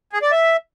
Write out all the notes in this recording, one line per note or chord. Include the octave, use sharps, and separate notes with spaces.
G#4
D5
E5